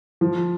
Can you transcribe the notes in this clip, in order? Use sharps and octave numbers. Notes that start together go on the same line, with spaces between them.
F3